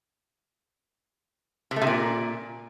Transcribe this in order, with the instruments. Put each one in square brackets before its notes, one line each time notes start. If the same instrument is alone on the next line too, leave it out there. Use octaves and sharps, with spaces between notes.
[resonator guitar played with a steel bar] C3
A3
C3
A#2